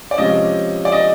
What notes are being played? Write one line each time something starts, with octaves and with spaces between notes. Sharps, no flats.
D5
C3 F3 G#3 C#4 D#5
D5
D#5